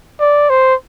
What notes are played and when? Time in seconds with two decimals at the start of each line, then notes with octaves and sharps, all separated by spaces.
0.20 D5
0.50 C5